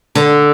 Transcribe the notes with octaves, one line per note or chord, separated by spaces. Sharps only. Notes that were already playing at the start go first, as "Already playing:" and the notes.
D3